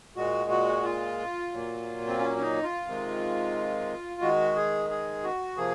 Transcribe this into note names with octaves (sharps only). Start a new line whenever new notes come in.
A#2 G#3 F#4
F#4
F4
A#2 F#3 A#3
C4
C#4
C#4
D#4
F4
C3 D#3 G#3
D#3 G#3 F#4
G#4
G#4
F#4
C3 F3 A#3 G#4